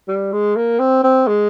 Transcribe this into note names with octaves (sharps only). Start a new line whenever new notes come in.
G3
G#3
A#3
C4
C4
G#3